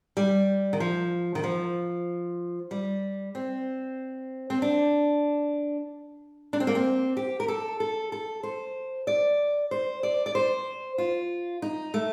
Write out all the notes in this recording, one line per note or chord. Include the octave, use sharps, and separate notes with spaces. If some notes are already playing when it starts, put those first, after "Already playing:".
G3
D#3
F3
D#3
F3
G3
C4
C4
D4
D4
C4
A#3
C4
G4
A#4
A4
A4
A4
C5
D5
C5
D5
D5
C5
F4
D#4
A3